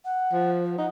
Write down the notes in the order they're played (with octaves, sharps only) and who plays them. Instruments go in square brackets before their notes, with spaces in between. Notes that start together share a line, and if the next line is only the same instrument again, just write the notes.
[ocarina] F#5
[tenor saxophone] F3
[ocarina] C5
[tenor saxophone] D#4 [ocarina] F#5